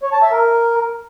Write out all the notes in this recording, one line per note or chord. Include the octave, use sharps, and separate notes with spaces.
C#5
A5
E5
A#4